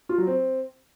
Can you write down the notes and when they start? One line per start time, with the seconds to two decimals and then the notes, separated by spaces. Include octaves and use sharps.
0.09 F4
0.18 F#3
0.27 C4